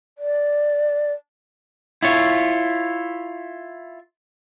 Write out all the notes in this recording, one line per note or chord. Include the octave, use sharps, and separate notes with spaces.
D5
E4 F4 C#5